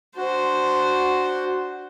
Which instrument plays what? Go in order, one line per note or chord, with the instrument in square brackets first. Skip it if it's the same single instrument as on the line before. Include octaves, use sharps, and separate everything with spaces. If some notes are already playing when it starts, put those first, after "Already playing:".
[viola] D4 C5 [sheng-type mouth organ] F#4